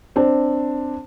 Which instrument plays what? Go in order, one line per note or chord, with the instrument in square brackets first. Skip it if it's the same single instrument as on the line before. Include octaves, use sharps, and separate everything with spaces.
[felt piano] C4 D4